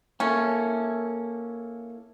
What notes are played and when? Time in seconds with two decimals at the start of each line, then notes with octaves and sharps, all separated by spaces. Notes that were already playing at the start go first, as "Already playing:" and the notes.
0.20 A#3 C#4 E4 A4